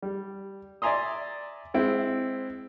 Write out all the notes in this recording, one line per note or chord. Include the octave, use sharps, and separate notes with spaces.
G3
D5 E5 G#5 A#5 C6 D#6
G#3 C4 E4